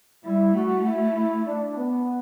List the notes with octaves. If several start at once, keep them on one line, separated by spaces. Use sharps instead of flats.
G3 E4
A3 F#4
E4
E4
D4
B3